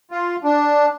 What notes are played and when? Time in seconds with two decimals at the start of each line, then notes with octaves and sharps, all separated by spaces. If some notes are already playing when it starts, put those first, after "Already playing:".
0.11 F4
0.44 D4